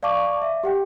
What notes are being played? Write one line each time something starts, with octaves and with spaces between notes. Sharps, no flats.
D5 F5 A5 C#6 D6
E5
G4 F#5 G5